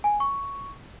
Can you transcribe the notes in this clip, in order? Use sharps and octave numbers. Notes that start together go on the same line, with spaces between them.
G#5
C#6